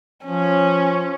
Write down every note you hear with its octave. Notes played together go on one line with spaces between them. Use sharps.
F3 C#4